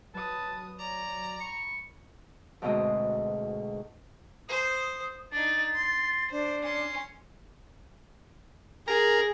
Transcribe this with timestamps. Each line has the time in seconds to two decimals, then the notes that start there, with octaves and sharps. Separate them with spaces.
0.14 F#3 B4 A5 D#6
0.79 C#5 D5 A#5
1.41 B5 C#6
2.62 D2 G#2 B2 G#3 C4 D#5
4.49 C5 D#6
5.32 D4 D#4 A6
5.75 C6
6.31 D4 C5
6.63 C#4 C6
8.88 G#4 A#4